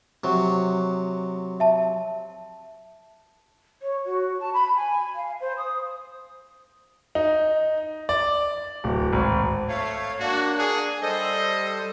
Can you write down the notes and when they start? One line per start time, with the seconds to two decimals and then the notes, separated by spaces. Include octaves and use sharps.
0.24 C3 F#3
1.60 E5 A5
3.82 C#5
4.05 F#4
4.40 A5
4.53 B5
4.76 G#5
5.15 F5
5.40 C5
5.57 D#6
7.15 D#4
8.09 D5
8.84 D1
9.13 G#1
9.68 A3 C#5 F5
10.20 A#3 D4 F#4
10.59 G#4
11.02 G3 A4 C5 D#5